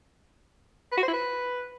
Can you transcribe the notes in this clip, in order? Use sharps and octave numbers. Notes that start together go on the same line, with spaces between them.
B4
F#4
C5
E4
B4